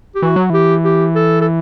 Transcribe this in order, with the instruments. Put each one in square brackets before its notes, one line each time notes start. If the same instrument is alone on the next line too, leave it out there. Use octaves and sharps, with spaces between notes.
[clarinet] G4
[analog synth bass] E3 [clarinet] F#4
[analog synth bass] F#3
[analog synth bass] E3 [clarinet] G4
[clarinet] G4
A4
A4